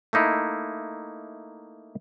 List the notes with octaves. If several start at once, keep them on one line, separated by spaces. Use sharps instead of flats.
A3 A#3 D#4 E4